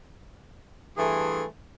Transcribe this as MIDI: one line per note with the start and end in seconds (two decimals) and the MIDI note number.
0.98 1.45 43
0.98 1.45 52
0.98 1.45 57
0.98 1.45 68
0.98 1.45 69
0.98 1.45 84